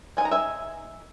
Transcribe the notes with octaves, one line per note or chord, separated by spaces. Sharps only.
G#3 D#4 G#5
A#5
E5 G#5